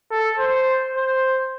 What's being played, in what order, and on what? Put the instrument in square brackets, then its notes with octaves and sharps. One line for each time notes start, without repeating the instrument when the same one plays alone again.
[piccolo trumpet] A4
C5
C5